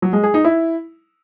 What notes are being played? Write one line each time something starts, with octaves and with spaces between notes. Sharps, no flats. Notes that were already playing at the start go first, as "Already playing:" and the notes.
F#3
G#3
G#4
D#4
E4